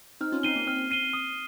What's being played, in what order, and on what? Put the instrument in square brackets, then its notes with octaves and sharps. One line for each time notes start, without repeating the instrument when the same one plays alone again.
[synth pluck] C4 D#4 [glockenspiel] F6
[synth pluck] C#4 F4
[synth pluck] C4 D#4 [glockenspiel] C7 D#7 G7
[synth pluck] A#3
[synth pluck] C4 [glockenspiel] F6
[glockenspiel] C7 D#7 G7
D#6